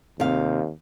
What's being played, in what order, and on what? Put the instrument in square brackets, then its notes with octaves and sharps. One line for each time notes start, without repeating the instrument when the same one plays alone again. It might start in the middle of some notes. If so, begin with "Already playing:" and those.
[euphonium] D#2 [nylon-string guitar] C3 F5